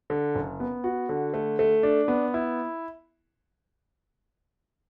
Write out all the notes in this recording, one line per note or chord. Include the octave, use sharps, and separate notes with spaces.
D3
F#1
B3
F#4
D3
A3
A3
D4
B3
E4